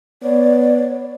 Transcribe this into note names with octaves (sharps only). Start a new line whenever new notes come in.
B3 C#5 D5